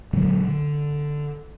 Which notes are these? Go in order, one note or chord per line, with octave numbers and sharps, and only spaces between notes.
A#2 D3 F#3 G#3
D3